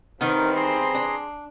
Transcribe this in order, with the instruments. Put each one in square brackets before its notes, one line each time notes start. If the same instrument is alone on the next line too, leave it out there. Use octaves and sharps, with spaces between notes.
[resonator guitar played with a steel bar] D#3 B3 [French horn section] E3 G3 C4 [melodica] D#4 A#4
[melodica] G#4 A#5 C6
[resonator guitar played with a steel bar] D4